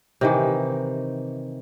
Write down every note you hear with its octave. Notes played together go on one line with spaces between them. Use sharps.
C3 D#3 E3